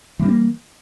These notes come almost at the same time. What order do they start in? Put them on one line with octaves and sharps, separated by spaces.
E3 G3 D4 A#3